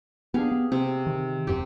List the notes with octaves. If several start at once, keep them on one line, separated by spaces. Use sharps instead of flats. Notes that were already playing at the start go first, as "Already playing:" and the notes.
B3 C4 D4 G4 G#4 F5
B3
C3 C4
D#3
D#1 F#2 C3 G4